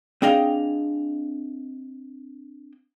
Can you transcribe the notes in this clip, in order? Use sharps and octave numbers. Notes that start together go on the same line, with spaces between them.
C4 D4 G#4 D#5 F5 G5